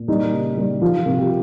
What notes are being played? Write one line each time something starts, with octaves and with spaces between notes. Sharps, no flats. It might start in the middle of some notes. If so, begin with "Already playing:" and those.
Already playing: A#2
G3 D#4
C#3
G3
F3 F4
C3
G4